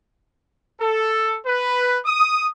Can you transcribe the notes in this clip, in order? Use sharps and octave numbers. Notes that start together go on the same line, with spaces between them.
A4
B4
D#6